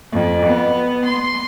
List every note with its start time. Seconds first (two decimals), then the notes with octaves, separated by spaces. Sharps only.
0.12 F2
0.45 B3
1.05 C6